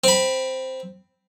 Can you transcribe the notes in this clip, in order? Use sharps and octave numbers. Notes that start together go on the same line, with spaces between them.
C4 B5